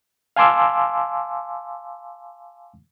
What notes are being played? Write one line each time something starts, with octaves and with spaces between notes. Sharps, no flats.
F5 G#5 A5 C6 D6 E6